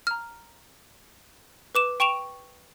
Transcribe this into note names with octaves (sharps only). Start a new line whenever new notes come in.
A#5 F6
B4 D6 E7
G5 C#6 D7 E7 F7